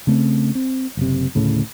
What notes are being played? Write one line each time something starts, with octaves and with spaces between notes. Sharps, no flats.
C#3 A3 C4
C4
F#1 C3
D2 A2 C#3